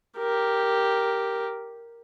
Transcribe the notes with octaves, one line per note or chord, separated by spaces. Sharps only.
G4 A#4